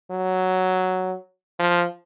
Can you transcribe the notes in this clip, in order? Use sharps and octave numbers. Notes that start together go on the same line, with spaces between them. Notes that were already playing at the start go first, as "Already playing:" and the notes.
F#3
F3